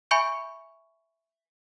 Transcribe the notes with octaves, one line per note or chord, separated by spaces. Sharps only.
E5 G#5 B5 C#6 G6 D7